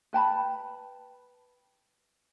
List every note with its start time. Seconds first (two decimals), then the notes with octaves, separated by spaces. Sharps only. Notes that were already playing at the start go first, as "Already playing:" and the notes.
0.13 B4 G5 A5 B5